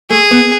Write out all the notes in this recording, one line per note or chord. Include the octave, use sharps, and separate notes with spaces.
A3 G#4
B3